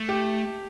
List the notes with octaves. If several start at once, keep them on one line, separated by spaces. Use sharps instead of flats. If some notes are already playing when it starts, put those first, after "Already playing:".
Already playing: A3
G4